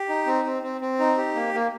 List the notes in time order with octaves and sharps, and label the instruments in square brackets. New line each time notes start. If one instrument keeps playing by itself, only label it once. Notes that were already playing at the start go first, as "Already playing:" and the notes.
Already playing: [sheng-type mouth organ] G4
D#4
C4
C4
C4
C4
D#4
G4
A#3
A#3